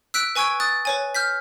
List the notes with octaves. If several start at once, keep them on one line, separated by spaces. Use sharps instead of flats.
E6 F#6 B6 D7
B4 G#5 C#6 E6 G#6 D7
D#6 F#6 A6
B4 C#5 G#5
F6 G6 B6